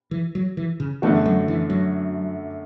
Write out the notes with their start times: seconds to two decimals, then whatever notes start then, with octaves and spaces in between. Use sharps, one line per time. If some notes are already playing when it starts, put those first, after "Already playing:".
0.11 E3
0.35 F#3
0.57 E3
0.80 C#3
1.02 F#2 D3 E3 A3 D4 F#4
1.26 F#3
1.48 E3
1.70 F#3